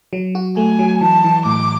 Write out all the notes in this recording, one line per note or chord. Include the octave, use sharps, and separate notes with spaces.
F#3
F#4
A3 G#5
F#3
E3 A5
E3
A2 D6